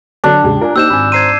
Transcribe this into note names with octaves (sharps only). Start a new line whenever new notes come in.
D3 F#3 D4 C#5
E2 A2 C#3 G#3 G4
F4 A#4 D5 G#5
A#3 D#4 G4 C5 E6 G6 E7
G#1 G#5 B5
C5 A#5 C6 G#6 C7 D#7